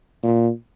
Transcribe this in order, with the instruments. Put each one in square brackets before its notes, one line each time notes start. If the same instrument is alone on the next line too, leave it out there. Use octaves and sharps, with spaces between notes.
[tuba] A#2